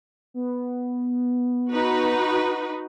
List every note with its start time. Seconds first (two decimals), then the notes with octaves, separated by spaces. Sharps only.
0.34 B3
1.72 D#4 F#4 B4